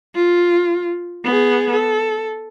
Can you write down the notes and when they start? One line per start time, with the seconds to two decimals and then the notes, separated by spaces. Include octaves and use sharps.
0.15 F4
1.24 B3 G#4
1.72 A4